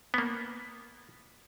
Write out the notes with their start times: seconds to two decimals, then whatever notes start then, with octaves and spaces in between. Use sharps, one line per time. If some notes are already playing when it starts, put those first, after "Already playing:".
0.14 A#3 B3